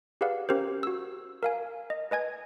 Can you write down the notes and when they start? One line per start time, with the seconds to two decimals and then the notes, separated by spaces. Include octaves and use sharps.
0.21 G4 G#4 B4 D5 F5 F#5
0.49 C#4 G4 A#4 C5
0.83 F#4 E6
1.43 A#4 F5 G#5
1.90 D#5
2.11 B4 D#5 G#5 G#6